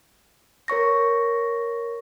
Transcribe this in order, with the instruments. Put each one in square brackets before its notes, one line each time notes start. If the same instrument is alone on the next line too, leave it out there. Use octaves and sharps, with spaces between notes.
[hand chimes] A#4 C#5 C#6 A#6